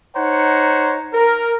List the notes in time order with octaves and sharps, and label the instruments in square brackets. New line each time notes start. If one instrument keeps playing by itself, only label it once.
[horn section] D#4 C5 C#5 F#5 A#5
A#4